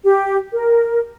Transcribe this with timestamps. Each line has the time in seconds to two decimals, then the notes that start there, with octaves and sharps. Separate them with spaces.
0.04 G4
0.53 A#4